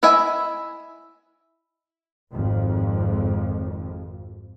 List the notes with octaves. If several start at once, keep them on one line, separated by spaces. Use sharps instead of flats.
E4 D#5 E5 G#5
G#1 F2